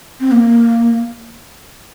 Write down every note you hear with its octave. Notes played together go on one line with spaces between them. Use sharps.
C4
A#3